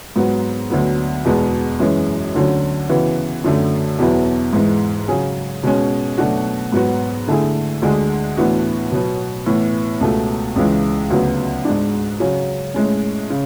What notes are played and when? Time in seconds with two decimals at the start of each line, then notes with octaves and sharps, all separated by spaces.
0.16 G#2 F#3 B3 F#4
0.70 D2 D3 F#3 B3
1.25 E2 B2 G#3 B3
1.80 F#2 E3 G#3 C#4
2.34 D2 D3 F#3 C#4
2.89 C#3 E3 B3 F#4
3.44 F#2 D3 F#3 A3
3.99 E2 B2 F#3 B3 E4
4.53 G#2 E3 G#3
5.08 C#3 F#3 C#4 G#4
5.63 B2 G#3 C#4
6.18 B2 F#3 A3 D4 F#4
6.72 G#2 F#3 B3 F#4
7.28 D3 A3 E4 G#4
7.82 D2 D3 G#3 D4 G#4
8.37 A2 E3 B3 D4 F#4
8.92 B2 F#3 B3
9.46 A2 E3 B3
10.01 C#2 B2 A3
10.56 C#2 C#3 E3 G#3
11.10 D2 C#3 F#3 B3
11.65 G#2 G#3 D4
12.20 C#3 F#3 C#4
12.74 A2 G#3 C#4
13.30 C#3